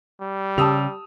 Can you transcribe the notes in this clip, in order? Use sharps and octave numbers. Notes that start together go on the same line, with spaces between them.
G3
C#3 G4 A5 D#6 E6 F7